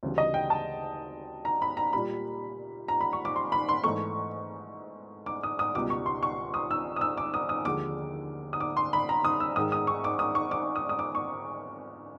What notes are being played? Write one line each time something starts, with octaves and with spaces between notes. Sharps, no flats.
D2 C#3 E3 G3
D#5
G5
A5
A#5
B5
A#5
A#2 G3 B5
A#5
B5
C#6
D6
C6
B5
C6
G#2 E3 A3 C#6
D6
D#6
D#6
C#2 B2 G3 D6
C#6
C6
C#6
D#6
E6
D#6
E6
D6
D#6
D#6
D#2 D3 F3 G#3 D6
D#6
D6
C6
B5
A#5
D#6
E6
G#2 D#3 G#3 D#6
D#6
C#6
D6
D#6
C#6
D6
D#6
D#6
D6
C#6